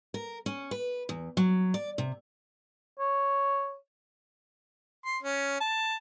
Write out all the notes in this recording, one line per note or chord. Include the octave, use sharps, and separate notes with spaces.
A#4
C#4
B4
E2
F#3
D5
C3
C#5
C6
C#4
A5